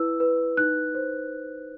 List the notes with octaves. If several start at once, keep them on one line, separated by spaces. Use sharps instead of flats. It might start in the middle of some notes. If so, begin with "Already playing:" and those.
Already playing: E4 B4 E6
B4
D#4 F#6
C5